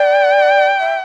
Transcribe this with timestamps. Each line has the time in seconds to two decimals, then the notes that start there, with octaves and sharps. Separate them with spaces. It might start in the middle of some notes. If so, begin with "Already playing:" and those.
Already playing: D5 G5
0.80 E5